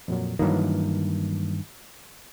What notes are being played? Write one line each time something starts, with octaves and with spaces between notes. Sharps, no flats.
F2 A#2 F#3
G2 D#3 E3 F#3 A#3